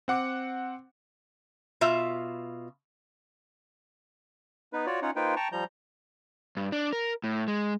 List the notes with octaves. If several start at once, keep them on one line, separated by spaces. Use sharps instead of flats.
C4 F#5 D6 C#7
B2 F4 E5
B3 D#4 B4
F4 F#4 C#5 D5
C#4 D#4 F4 C#5 F#5
A#3 D#4 F4 B4 C5 G5
G5 A5 A#5 C#6
F3 G3 A#5 G6
G2
D4
A#4
A2
G#3